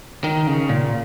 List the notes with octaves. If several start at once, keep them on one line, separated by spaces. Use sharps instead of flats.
D#3
C#3
A#2